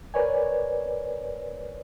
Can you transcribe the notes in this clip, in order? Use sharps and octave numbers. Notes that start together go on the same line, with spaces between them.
A#4 B4 C#5 D5 G#5